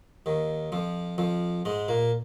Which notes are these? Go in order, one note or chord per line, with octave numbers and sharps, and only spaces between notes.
D#2 D#3
F2 F3
F2 F3
G#2 G#3
A#2 A#3